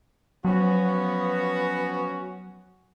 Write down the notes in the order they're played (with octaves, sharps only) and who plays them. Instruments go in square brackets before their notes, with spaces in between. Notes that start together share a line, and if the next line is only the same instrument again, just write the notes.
[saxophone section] F3 B3 [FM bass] F#3 [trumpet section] C#4 F#4